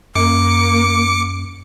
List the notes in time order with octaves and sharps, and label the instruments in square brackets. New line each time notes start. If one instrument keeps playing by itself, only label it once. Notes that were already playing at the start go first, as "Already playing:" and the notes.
[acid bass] F#2 [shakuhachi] A#3 [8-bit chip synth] D6 C#7